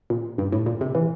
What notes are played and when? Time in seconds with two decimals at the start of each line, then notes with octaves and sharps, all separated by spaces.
0.10 A#2
0.38 G2
0.52 A2
0.66 A#2
0.81 C3
0.95 E3